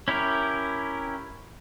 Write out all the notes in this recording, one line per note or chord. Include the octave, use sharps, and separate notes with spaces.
C#4 E4 G4 A#4